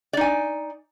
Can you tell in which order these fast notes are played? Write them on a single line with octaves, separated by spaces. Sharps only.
D5 D#4 G#5